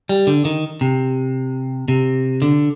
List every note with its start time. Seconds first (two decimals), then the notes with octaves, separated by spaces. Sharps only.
0.09 G3
0.27 D3
0.45 D#3
0.81 C3
1.88 C3
2.42 D3